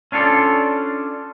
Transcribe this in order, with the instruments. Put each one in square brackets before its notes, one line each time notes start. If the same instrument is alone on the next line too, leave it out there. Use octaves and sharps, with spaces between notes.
[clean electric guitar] C#4 D4 F4 A4 D5